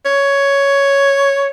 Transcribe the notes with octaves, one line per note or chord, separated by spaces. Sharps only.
C#5